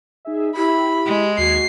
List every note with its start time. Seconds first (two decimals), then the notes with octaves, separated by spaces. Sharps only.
0.25 D#4 G#4 E5
0.57 E4 G4 B5
1.06 G#3
1.38 D#2 F#4 G#6 C7